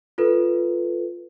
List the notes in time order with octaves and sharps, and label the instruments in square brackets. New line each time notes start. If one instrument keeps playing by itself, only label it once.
[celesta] F4 A4 B4